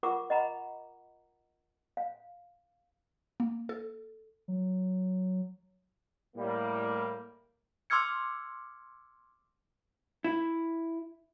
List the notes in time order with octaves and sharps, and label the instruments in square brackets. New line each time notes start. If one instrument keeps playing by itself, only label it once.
[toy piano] F4 A#4 F#5 C#6 D6
D#5 F#5 A#5 B5
F5
[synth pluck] A#3
A4
[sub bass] F#3
[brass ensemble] A2 G3 A#3
[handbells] C6 D6 E6 F6 G#6 C#7
[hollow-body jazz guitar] E4